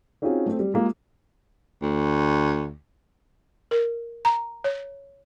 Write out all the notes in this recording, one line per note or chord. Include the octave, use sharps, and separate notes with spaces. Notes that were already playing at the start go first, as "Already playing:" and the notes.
C4 C#4 D#4 F4 F#4 G#4
A3 C4
G3
G#3 A#3 F4 G4 G#4
D2
A#4
A#5
C#5